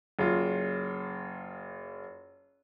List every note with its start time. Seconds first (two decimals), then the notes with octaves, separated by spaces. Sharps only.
0.19 F#1 F4